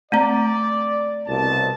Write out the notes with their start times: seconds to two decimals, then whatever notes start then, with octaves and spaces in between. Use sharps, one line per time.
0.12 A3 C4 D5 A#5
1.27 C2 B2 A5